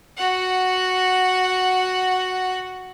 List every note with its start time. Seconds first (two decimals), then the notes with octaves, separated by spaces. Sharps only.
0.17 F#4 F#5